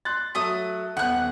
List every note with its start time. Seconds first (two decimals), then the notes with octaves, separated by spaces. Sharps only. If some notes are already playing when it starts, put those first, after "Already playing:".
0.05 C6 F#6 A6
0.35 F#3 A3 A4 E5 D#6
0.97 D#1 B3 F#5 F#6